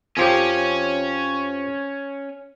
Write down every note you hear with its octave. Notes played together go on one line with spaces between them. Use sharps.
F2 F3 C#4 G4 C#5